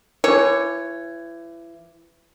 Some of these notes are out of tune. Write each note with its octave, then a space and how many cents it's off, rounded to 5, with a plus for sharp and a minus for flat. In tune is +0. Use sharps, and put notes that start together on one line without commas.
E3 +30 C#5 +0